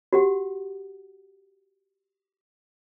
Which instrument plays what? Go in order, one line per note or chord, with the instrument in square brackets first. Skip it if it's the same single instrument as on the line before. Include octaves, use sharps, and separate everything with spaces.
[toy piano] F#4 G4 F#5